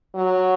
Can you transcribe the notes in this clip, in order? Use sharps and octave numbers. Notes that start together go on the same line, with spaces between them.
F#3